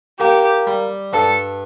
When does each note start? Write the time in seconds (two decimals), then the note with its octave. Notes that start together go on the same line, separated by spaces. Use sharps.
0.19 A#3 G4
0.67 G3
1.13 G2 A4